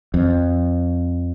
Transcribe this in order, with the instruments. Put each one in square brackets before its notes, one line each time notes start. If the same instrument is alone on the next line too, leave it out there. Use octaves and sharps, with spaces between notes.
[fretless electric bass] F2